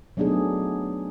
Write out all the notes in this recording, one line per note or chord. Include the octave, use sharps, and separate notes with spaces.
F#3 A3 B3 D4 D#4 G#4